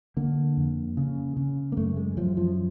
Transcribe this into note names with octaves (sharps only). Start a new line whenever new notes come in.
D3 A#3
F2
C#3
C#3
A#3
F#2 A3
G#3
F#2 F3
F3